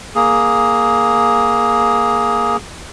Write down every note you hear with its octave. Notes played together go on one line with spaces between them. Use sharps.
A#3 G#4